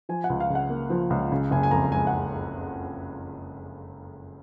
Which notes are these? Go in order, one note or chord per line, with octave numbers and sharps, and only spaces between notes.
F3 G#5
F#5
C#2
F5
C#3
F#5
A#3
F3
C#2
C#3
F#1 G#5
G#5
F2 A#5
G#3 G#5
F#5